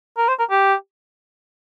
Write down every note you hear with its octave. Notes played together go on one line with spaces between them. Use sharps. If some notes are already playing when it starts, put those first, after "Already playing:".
A#4
C5
A#4
G4